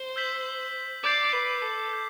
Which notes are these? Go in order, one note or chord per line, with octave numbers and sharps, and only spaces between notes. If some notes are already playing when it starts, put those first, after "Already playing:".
Already playing: C5
E6 G6 B6 F#7
D5 D6 G6 C7
B4
A4
G6 C7